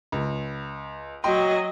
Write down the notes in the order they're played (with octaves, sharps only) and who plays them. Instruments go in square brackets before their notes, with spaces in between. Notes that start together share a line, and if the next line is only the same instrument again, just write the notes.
[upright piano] C#2
[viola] F#3 D#5 [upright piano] G5 C6